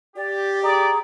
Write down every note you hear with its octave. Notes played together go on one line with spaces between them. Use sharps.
G4 D5
G#4 D5 A#5